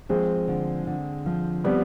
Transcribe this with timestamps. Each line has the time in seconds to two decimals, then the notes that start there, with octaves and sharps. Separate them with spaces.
0.09 F3 G#3 C4
0.48 D3
0.87 D3
1.26 F3
1.64 G3 B3 C4